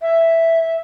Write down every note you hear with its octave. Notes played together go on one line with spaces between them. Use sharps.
E5